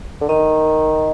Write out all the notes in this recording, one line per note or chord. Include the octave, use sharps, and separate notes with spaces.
D3
D#3 D#5